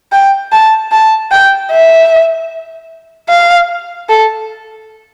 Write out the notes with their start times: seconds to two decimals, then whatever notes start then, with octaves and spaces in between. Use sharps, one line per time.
0.12 G5
0.52 A5
0.92 A5
1.31 G5
1.71 E5
3.30 F5
4.09 A4